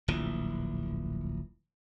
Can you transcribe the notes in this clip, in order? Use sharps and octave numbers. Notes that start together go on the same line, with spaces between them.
D1 A#1 E3